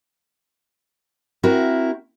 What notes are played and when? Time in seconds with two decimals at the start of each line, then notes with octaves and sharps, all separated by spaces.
1.43 C4 E4 F#4 A#4